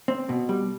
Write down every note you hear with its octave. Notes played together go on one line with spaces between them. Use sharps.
C4
B2
G3